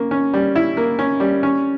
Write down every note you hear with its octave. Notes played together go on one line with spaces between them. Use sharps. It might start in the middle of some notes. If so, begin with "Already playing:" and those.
Already playing: A#3 C#4
C#4
G3
E4
A#3
C#4
G3
C#4